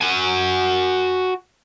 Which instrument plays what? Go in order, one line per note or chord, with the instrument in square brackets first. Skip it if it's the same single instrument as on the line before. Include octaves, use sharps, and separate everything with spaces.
[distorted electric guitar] F#4 G#5